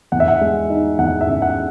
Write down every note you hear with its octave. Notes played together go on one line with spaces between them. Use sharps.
E2 F#5
E5
F#5
G#3
D#4
E2 F#5
E5
C#3
F#5